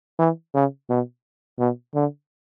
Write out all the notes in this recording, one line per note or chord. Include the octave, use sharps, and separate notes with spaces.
E3
C#3
B2
B2
D3